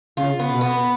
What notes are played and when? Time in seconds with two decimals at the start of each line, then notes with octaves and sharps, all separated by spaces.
0.17 C#3 F4
0.39 B3
0.51 B2
0.61 B3